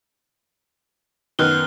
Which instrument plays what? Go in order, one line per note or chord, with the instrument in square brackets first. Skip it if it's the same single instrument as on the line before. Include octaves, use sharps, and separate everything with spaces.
[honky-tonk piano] F#2 D#3 B3 [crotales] F6 F#6 G7